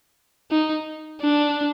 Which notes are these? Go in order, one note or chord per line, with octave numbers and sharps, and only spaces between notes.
D#4
D4